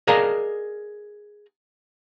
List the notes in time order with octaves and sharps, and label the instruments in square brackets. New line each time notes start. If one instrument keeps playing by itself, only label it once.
[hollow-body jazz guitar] G#4 A#4 D5 D#5 F5 A#5